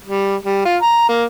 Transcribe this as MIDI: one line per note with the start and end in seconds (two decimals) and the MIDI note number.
0.05 0.35 55
0.43 0.62 55
0.65 0.76 65
0.82 1.07 82
1.09 1.24 58